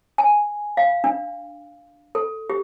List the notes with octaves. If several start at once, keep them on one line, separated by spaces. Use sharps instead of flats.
G#5
F5
D4
A4
G4